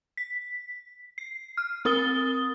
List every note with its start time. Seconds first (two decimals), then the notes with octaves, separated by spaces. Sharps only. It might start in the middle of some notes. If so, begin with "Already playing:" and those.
0.17 B6
1.18 C7
1.57 F6
1.85 C4 A#4 D#6 A6 G7